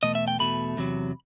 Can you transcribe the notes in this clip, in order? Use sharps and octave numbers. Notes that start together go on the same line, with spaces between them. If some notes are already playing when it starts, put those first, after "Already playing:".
E2 B2 A3 D#5
E5
G5
E2 B2 A3 B5
E2 C3 F#3